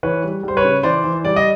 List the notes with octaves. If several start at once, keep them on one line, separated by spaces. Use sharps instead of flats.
E3 B4 C#5
G3
G3 C5
B4 C#5
C#3
E3 C5 D5
E3
G3 D5
D#5